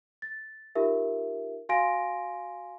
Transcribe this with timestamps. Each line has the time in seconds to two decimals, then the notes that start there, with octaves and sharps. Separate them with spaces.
0.22 A6
0.75 D#4 F4 G4 A#4 E5
1.69 F#4 F5 G#5 C6 A#6 D7